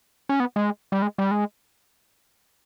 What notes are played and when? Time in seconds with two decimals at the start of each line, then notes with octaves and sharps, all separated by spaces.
0.29 C#4
0.40 B3
0.56 G#3
0.92 G3
1.02 G#3
1.18 G3
1.31 G#3